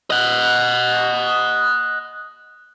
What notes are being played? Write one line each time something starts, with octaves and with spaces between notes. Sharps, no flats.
D#5 F#5